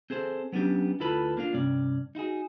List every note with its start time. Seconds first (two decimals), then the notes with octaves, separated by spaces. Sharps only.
0.10 C4 G#4 A4 C5
0.53 F#3 B3 C#4 D4 G4
1.00 D2 E4 F4 A4 B4 B5
1.37 A#3 D4 F4
1.53 G2 C3 C#4 D5
2.15 D#4 E4 F#4 G#4